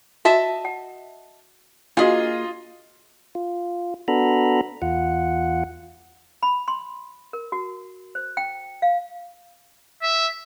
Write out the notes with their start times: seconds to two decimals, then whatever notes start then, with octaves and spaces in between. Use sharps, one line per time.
0.25 F#4 D#5 E5 A5
0.65 F#5
1.97 A#3 D4 F4 F#4 G#4 D#5
3.35 F4
4.08 B3 D4 F#4 A4 A#5 B5
4.82 E2 F4 F#5
6.43 B5
6.68 C6
7.33 A#4
7.52 F#4
8.15 C5
8.37 G5
8.82 F5
10.02 E5